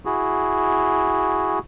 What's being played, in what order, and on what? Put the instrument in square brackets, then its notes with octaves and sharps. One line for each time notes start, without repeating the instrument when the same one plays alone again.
[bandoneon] E4 F#4 G#4